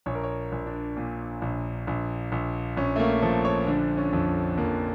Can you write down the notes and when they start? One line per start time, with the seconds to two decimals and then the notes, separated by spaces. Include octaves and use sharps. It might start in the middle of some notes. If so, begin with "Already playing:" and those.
0.06 A#1 C#5
0.15 A#4
0.23 C#5
0.52 A#1
0.66 D4
0.97 A#2
1.42 A#1
1.87 A#1
2.32 A#1
2.77 A#1 C#4
2.96 A3
3.00 A#3
3.22 F3 A4
3.45 C#5
3.67 D3 D4
3.98 C#4
4.13 F2
4.57 F2 A#3